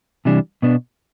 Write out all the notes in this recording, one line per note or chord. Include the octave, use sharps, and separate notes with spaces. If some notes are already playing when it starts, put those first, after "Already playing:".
C3 E3 G3 D4
B2 B3 D4